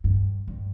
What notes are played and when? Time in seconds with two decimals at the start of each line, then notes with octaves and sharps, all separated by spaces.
0.04 G2
0.48 G2